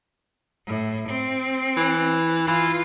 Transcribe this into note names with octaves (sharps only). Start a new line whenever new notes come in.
A2
C4
E3
E3 F4